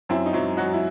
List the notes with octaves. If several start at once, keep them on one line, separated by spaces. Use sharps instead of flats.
F#2 C4 E4
D#4
F#3 C4 E4
F#3 D#4 F#4
E4